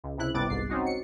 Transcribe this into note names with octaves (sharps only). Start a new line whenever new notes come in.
C#2
C#2 C3 E4 F#6
G1 G2 C3 B3 D6 A6
G1 C2 G#2 C7
C4 C#4 D#4 F#4
C#7